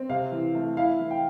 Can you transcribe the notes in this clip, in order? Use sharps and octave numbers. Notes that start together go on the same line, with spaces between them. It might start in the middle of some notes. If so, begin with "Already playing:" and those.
Already playing: C4
C3 F5
E3
A3
E4 F5
E3
G5